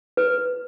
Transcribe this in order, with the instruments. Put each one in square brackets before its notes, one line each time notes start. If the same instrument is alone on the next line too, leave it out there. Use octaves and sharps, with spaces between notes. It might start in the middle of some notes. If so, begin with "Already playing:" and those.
[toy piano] B4